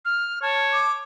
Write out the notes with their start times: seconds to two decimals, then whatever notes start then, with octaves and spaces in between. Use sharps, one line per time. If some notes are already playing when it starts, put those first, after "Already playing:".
0.05 F6
0.42 C#5 A5
0.73 D6